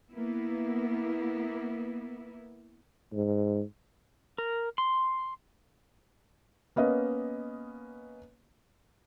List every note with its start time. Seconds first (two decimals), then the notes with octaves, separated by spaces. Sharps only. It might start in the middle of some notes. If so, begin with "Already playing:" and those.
0.13 A#3 B3 E4
3.13 G#2
4.38 A#4
4.78 C6
6.76 A#3 B3 C#4 D#5